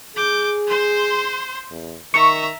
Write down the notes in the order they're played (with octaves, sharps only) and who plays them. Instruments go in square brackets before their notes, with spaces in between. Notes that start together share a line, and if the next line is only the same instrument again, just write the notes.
[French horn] G#4 [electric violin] D6 G6
[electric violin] C5 C6
[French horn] E2
[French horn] D#3 [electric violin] E5 A#5 [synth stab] C#6